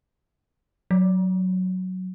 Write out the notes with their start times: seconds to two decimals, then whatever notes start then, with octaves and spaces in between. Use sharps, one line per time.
0.91 F#3